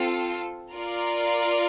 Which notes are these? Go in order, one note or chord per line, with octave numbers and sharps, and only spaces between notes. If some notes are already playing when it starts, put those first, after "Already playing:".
Already playing: C4 F4 A4
F4 A#4 D5